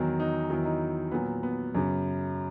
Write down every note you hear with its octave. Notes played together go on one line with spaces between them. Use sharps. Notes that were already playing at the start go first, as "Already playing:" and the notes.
Already playing: E2 D#3 F#3
D#4
E2 D#3 F#3 E4
D#4
A#2 F#3 B3
B3
F#2 C#3 F#3